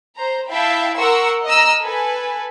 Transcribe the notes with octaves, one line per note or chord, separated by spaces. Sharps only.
C5 A#5
E4 E5 F5 G5 A5 B5
A#4 F#5 C6 C#6 E6
D#5 A#5 E6 F6
A4 B4 G#5